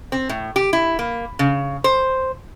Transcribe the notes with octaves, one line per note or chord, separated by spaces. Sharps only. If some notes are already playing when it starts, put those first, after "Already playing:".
C4
A2
G4
E4
A#3
C#3
C5